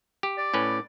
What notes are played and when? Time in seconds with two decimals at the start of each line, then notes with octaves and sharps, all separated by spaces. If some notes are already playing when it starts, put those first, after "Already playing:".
0.23 G4
0.38 D5
0.54 A2 C#4 B4